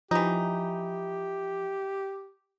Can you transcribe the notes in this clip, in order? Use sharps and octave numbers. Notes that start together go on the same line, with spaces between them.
E3 F3 D#4 G4